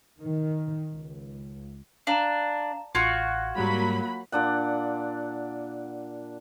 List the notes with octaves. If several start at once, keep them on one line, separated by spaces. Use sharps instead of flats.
D#3
C#2
D4 F5 A#5 E7
A1 F4 F#4 C#6 G#6
G#2 F#3 G3 A#3 B5
A#2 D4 D5 F#5